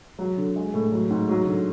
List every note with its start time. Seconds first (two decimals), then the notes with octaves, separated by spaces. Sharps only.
0.19 F#3
0.37 D3
0.56 G#3
0.74 A2
0.92 F#3
1.10 G#2
1.29 F#3
1.46 D3